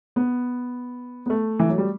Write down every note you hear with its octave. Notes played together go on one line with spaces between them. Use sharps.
B3
B3
A3
E3
F#3
G3